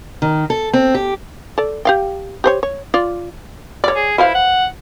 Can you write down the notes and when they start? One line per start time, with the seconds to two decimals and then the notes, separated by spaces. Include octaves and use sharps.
0.22 D#3
0.50 A4
0.73 C4
0.94 G4
1.58 A4 D5
1.85 G4 F5 G5
2.44 G4 C5 C#5
2.63 C#5
2.94 F4 D5
3.84 C#5 D5
3.95 G#4
4.18 E4 B4 C5 F5
4.35 F#5